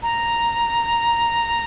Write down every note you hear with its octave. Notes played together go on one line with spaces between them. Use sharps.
A#5